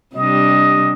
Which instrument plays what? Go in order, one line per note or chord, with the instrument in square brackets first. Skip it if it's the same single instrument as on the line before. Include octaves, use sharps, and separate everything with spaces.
[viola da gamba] C3 G3 D4 [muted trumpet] D#5